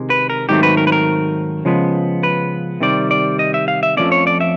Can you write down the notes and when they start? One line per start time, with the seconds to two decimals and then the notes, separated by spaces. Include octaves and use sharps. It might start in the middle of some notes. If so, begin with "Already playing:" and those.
Already playing: C3 D#3 G#3
0.10 B4
0.30 A#4
0.49 G#2 D#3 F#3 A3 C4 G4
0.63 B4
0.77 A#4
0.87 B4
0.92 A#4
1.65 C#3 F3 G#3 B3
2.23 B4
2.80 C3 D#3 G3 C4 D5
3.11 D5
3.39 D#5
3.54 E5
3.68 F5
3.83 E5
3.97 F2 C#3 F3 A3 C#4 D5
4.12 C#5
4.27 D5
4.41 E5